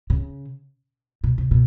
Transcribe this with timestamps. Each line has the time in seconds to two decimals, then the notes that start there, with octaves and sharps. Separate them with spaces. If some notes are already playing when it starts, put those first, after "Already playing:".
0.10 C#3
1.24 B2
1.38 C3
1.51 B2